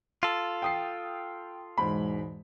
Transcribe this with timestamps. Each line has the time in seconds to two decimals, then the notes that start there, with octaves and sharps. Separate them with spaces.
0.23 F4 A4
0.62 G5 D#6 C7
1.78 E1 G#2 B5